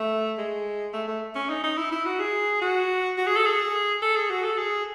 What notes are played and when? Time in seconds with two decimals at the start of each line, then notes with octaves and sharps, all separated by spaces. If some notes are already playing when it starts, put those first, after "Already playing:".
Already playing: A3
0.38 G#3
0.93 A3
1.08 A3
1.35 C#4
1.49 D#4
1.63 D#4
1.77 E4
1.92 E4
2.05 F#4
2.20 G#4
2.61 F#4
3.18 F#4
3.27 G#4
3.37 A4
3.46 G#4
4.02 A4
4.16 G#4
4.30 F#4
4.44 A4
4.58 G#4